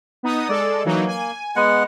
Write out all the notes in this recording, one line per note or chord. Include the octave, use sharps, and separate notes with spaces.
B3 D#4 D#6
G#3 A4 D5
E3 F#3 A#3 D#4
G#5
G#3 B3 F#5